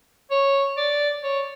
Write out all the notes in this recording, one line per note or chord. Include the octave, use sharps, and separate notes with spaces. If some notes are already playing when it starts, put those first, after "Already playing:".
C#5
D5
C#5